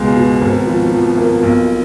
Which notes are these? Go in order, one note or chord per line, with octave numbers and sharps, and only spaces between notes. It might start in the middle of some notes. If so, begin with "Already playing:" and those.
Already playing: C#2 B2 G#3
B2
G#1
F3
F3
A#3
B1